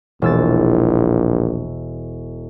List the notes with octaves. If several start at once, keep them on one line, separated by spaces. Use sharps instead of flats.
E1 A#1 E6 A6